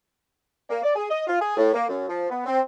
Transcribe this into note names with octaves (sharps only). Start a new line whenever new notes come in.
A#3
D5
G#4
D#5
F4
G#4
A2
A#3
F#2
F3
B3
C4